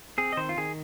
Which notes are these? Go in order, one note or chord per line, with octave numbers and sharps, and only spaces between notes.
C4 G#4
D#5
D#3 C5
F4
D#3 G#4